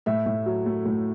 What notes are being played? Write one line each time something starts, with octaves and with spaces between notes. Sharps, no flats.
A2 E5
A2
F#3
A3
A2